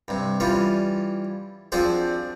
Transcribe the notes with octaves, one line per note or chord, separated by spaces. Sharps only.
G2 C3
E3 G3 C#4 F4
F3 C4 D4 F#4 G#4 C5